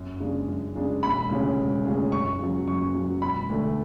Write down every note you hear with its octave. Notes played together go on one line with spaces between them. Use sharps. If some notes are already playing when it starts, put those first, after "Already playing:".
Already playing: F#2
C#3 G#3 D4
F#2
C#3 G#3 D4
E1 B5
D2 C#3 G#3 C#4
E1
D2 C#3 G#3 C#4
F#2 C#6
C#3 F#3
F#2 C#6
C#3 F#3
E1 B5
D2 D3 A3